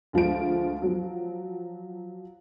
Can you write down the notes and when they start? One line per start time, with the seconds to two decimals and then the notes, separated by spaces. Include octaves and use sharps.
0.13 D2 F3 G#3 D7
0.82 F3 F#3